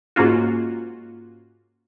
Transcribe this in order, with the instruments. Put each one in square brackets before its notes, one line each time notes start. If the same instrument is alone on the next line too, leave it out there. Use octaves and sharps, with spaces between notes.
[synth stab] G#2 A#3 C#4 F4 F#4